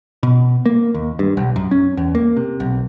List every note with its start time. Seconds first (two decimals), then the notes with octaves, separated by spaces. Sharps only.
0.23 B2
0.66 A#3
0.95 D#2
1.19 G2
1.37 B1
1.56 F#2
1.71 C#4
1.97 E2
2.15 A#3
2.37 C3
2.60 B1